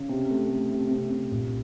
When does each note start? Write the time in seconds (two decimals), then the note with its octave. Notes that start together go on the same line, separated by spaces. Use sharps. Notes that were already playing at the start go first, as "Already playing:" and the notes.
Already playing: C#3
0.09 C3
0.30 A3
0.50 A3
0.70 C3
0.91 C3
1.11 C3
1.31 A#1